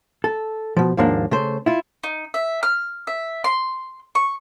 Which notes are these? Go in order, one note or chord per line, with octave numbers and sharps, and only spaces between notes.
A4
B2 F3
D#2 G#2 F3 A#3 D4
C#3 A3 C5
E4 F4
D#4
E5
F6
E5
C6
C#6